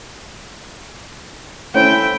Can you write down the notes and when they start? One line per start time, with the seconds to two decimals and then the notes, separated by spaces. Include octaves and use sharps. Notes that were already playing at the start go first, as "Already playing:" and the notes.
1.75 A3 C#4 E4 C5 G5